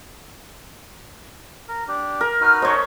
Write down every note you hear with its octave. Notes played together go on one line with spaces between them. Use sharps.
A#4
D4 G4
A#4
D#4 F#4 B4 F6
A3 C#4 C5 C#5 D#5